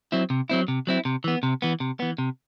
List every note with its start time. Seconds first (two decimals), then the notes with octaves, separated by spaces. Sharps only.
0.12 F#3 C4 E4
0.30 C3
0.50 F#3 C4 E4
0.68 C3
0.87 F#3 C4 E4
1.05 C3
1.24 E3 B3
1.43 C3
1.62 E3 B3
1.80 C3
2.00 E3 B3
2.18 C3